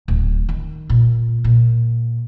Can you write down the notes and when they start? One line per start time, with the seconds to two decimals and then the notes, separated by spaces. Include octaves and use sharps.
0.08 D1
0.49 D#3
0.90 A#2
1.44 A#2